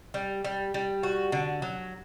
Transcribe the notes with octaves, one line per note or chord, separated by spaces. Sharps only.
G3
G3
G3
F#4
D3
F#3